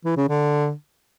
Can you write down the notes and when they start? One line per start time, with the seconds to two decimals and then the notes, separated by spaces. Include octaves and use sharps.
0.05 E3
0.17 C#3
0.28 D3